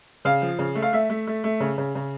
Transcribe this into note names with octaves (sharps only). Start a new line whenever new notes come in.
C#3 F5
F3
C#3
A3
F5
A3 E5
A3
A3
A3
C#3
C#3
C#3